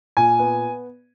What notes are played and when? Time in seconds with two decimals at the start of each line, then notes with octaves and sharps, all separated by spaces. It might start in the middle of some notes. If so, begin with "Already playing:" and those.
0.17 A#2 G#5
0.39 B3